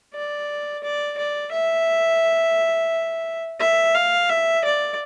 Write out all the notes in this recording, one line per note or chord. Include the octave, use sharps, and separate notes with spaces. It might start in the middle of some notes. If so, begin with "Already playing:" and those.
D5
D5
D5
E5
E5
F5
E5
D5